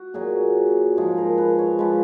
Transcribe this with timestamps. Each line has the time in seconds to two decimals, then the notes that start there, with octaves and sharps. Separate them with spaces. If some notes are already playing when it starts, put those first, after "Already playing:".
Already playing: F#4
0.14 A#2 F#3 G#4
0.97 G#2 F3 G#3 G#4
1.18 A#4
1.38 B4
1.59 C#5
1.79 F3 G#3 B4